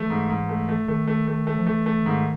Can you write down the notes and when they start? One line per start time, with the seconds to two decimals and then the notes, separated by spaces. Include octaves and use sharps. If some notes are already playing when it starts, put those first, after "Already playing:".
Already playing: E3 A3
0.10 G#2
0.30 G#2
0.49 A3
0.69 A3
0.88 D#3 A3
1.07 A3
1.27 A3
1.47 A3
1.58 F3
1.66 E3 A3
1.86 A3
2.05 G#2 D#3